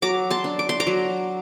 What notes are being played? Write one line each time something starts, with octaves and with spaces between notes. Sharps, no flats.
F#3 A#5 D6
A5 C6
D4
D6
C6
A#5 D6
F#3